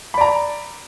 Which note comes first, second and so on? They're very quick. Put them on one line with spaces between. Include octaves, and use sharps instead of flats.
B5 D5 A#5